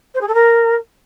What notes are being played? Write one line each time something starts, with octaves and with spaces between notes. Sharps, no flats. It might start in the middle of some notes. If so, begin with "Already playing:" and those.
C5
G#4
A4
A#4